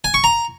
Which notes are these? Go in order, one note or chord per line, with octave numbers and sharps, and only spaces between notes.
G#5
C#6
A#5